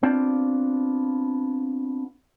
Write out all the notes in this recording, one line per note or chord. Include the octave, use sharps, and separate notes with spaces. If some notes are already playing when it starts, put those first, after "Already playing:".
B3 C4 D4 F4